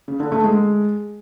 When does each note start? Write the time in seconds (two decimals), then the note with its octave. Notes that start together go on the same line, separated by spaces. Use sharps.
0.08 C#3
0.20 D3
0.32 A3
0.44 G#3